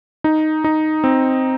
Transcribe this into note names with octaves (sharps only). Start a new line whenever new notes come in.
D#4
D#4
C4